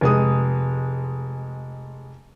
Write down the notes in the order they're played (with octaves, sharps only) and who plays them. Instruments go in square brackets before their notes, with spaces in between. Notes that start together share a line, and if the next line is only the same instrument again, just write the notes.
[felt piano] F1 G#3 D#6